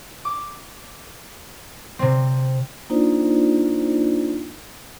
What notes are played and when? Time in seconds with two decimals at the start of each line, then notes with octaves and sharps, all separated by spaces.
0.25 D6
1.99 C3 C4
2.90 A#3 D4 D#4 F4 C5 D5